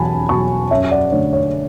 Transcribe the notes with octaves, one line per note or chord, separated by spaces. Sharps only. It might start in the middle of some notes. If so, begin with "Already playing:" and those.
Already playing: E2 B2 F#3 F#5 G#5 A5 B5
B2 F#3 A5 C#6
F#2 C#5 E5
D5 F#5
D3 A3 C#5
C#5